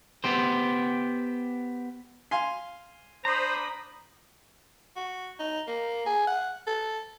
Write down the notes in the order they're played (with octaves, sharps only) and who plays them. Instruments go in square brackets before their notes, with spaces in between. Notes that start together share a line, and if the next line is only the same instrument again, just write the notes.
[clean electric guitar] B3 G4 C5
[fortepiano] F5 G#5 C6
[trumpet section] D4 B5 D#6 [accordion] C5 [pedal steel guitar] A#5
[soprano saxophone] F#4
D#4
A#3
G#4
F#5
A4